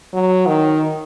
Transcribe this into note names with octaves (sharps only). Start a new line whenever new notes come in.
F#3
D#3